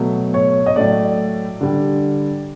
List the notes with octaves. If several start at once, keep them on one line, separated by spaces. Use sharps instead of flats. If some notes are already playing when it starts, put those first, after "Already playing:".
Already playing: B2 F#3 A3
C#5
D#5
A2 F#3 A3 D5
D3 G3